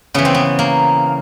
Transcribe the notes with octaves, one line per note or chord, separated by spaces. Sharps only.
C#3 E3 B3
C4
B3
A#3